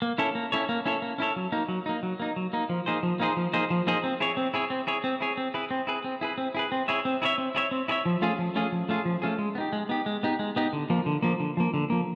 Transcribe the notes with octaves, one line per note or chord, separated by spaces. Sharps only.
A#3
C#4 E4 A4 C#5
A#3
C#4 E4 A4 C#5
A#3
C#4 E4 A4 C#5
A#3
C#4 E4 A4 C#5
F#3
A#3 D#4
F#3
A#3 D#4
F#3
A#3 D#4
F#3
A#3 D#4
F3
A#3 D#4 G#4 C5
F3
A#3 D#4 G#4 C5
F3
A#3 D#4 G#4 C5
F3
A#3 D#4 G#4 C5
C4
E4 G#4 C#5
C4
E4 G#4 C#5
C4
E4 G#4 C#5
C4
E4 G#4 C#5
C4
E4 G#4 B4
C4
E4 G#4 B4
C4
E4 G#4 B4
C4
E4 G#4 B4
C4
E4 G#4 C#5 E5
C4
E4 G#4 C#5 E5
C4
E4 G#4 C#5 E5
C4
E4 G#4 C#5 E5
F3
A3 C#4 F4 G#4
F3
A3 C#4 F4 G#4
F3
A3 C#4 F4 G#4
F3
A3 C#4 F4 G#4
G#3
B3
D#4 G4
G#3
B3 D#4 G4
G#3
B3 D#4 G4
G#3
B3 D#4 G4
D3
F3 A#3
D3
F3 A#3
D3
F3 A#3
D3
F3 A#3